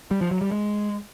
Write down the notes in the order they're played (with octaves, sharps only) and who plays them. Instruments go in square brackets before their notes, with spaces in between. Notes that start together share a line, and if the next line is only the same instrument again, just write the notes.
[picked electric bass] G3
F3
F#3
G3
G#3